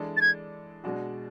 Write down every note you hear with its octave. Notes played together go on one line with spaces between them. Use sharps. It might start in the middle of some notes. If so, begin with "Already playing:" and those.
Already playing: E3 G#3 D4 A4
A6
G#6
B2 G#3 D4 F#4